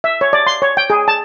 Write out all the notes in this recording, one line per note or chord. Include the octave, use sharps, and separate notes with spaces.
E5
C#5
D5
C6
C#5
G5
G#4
A5